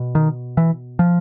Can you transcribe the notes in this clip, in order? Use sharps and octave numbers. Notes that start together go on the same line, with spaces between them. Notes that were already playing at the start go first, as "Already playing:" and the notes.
Already playing: B2
D#3
E3
F3